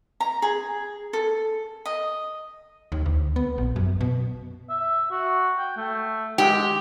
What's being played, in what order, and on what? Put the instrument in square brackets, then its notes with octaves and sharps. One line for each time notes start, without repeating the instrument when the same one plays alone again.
[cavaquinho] A#5
G#4
A4
D#5
[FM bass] D#2
D2
B3
A#1
F#2
B2
[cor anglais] E5
F#4
G5
A3
[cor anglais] G#3 [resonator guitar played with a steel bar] G4